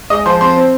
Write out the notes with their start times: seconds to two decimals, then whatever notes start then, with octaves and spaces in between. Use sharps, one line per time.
0.10 G#3 D#5 D#6
0.26 F3 C5 C6
0.41 C4 C5 C6
0.56 C4